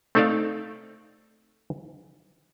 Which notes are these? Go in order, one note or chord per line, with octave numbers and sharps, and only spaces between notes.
A3 C4 D#4 A4 D5 F5